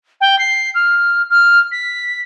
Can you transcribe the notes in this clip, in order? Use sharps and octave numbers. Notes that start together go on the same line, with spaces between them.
G5
C7
F6
F6
B6